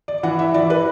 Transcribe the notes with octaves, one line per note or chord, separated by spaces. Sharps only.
D5
E3 F#5
E5
E3 D5
B4